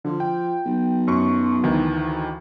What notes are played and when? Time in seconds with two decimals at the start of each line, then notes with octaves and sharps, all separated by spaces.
0.05 D3 F3
0.20 G5
0.66 B1
1.08 F#2 C#6
1.63 D2 D#3 E3